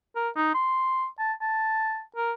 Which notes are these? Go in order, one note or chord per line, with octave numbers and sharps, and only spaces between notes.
A#4
D#4
C6
A5
A5
A#4